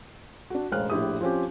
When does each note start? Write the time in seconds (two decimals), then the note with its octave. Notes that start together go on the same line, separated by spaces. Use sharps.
0.50 D4 F#4
0.72 E1 A1 C5 F5 F6 F#6
0.90 A#1 A2 E4 G4 D#6
1.21 F3 C4 C#4 F4 G4